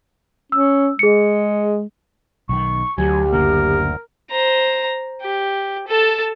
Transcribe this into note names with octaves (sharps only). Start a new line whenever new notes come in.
C#4 E6
G#3 G#4 C#7
B1 D#3 C#6
D2 F#3 G4 G#5
F#1 D3 A#3 A#4
C5 A#5
G4
A4 A5